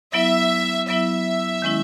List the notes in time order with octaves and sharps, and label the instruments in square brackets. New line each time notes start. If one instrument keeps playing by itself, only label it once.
[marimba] F#3 B3 E4 [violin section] E5
[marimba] F#3 B3 E4 [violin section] E5
[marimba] D#3 G#3 C#4 E4